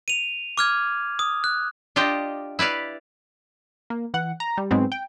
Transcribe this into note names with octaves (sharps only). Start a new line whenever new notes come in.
D#7 F7
D6 F6 G#6
D#6
F#6
D4 F4 G4 D#5
E4 B4 D5 F5
A#3
E3 F#5
A#5
G3
G#2 F#3 G#3 B3 C4
G5